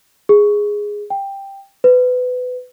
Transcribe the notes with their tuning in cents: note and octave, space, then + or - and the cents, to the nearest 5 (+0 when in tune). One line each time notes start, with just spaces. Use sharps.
G#4 -5
G5 +10
B4 +25